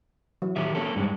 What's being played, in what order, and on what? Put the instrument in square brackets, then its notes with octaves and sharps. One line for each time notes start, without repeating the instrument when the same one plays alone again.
[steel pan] E3 F#3
[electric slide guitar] D#3 G4 E5
A#3 C#4 A4
[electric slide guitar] G2 G#3 [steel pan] G3 D4